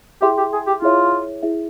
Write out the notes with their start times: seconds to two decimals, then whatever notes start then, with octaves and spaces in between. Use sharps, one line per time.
0.22 E4 G4 G#4 E5 G5 C6
0.38 G4
0.53 G#4
0.67 G4
0.82 E4 F4 G#4 C#5 E5
1.43 E4 G#4 E5